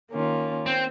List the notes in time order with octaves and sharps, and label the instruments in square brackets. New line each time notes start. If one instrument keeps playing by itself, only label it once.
[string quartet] D#3 A#3 C#4 F4
[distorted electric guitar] C4